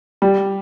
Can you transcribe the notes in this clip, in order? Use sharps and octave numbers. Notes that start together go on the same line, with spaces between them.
G3